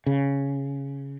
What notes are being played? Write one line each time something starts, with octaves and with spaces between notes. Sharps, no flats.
C#3